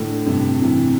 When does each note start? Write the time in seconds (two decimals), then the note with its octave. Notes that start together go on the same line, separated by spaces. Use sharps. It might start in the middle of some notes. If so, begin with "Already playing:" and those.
Already playing: A2 D3
0.26 G2 C3
0.62 C3 E3